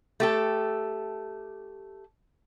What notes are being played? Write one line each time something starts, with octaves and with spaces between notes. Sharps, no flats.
A3 G4 A4